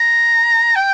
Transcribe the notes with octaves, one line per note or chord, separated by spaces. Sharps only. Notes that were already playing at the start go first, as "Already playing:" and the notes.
Already playing: A#5
G5